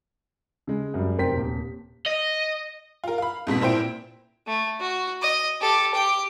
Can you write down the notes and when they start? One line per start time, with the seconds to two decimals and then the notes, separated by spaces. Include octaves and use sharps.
0.67 C#3 G#3
0.94 F#2 G3
1.18 F1 A#4 C5 G5 B6
1.36 D#1
2.06 D#5
3.04 F4 A#4
3.18 F5 B5
3.47 F2 G#2 B2 B6
3.61 A#2 E4 C5 G5 D7
4.47 A3
4.80 F#4
5.22 D#5
5.61 G4 A4
5.94 G4 G5